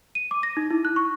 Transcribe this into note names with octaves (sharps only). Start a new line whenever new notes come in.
D#7
D6
A#6
D#4
E4
F#6
C#6